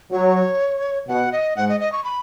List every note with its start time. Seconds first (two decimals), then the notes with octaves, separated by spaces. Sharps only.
0.11 F#3 C#5
1.08 B2 F#5
1.32 D#5
1.56 G#2 F#5
1.69 D#5
1.81 D#5
1.92 C#6
2.04 B5